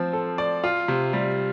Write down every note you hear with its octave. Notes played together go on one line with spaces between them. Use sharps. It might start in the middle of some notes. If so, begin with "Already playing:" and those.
Already playing: F3 C4
A4
D5
F4
C3
G3